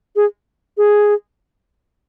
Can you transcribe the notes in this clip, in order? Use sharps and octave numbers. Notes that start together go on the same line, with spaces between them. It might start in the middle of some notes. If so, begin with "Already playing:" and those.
G#4
G#4